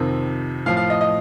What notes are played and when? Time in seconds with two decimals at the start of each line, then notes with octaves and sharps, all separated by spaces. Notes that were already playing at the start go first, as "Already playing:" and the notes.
Already playing: F2 C3 D#3
0.66 A2 F3 F5
0.77 F5
0.90 D#5
1.01 D#5